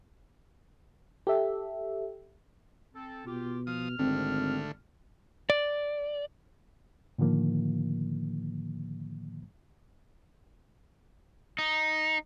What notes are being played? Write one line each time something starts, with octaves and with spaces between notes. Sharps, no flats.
G4 A4 E5
C4 A4
B2 F4 G4
F3 D#6 F6
G#1 D3 A3 C4
D5
A2 D3 D#3 F3 A#3
D#4